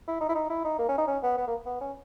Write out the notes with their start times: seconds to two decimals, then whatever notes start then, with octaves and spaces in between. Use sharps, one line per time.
0.08 E4
0.20 D#4
0.29 E4
0.35 D#4
0.50 E4
0.64 D#4
0.78 A#3
0.88 C#4
0.98 D#4
1.07 C#4
1.23 B3
1.37 B3
1.47 A#3
1.66 B3
1.81 C#4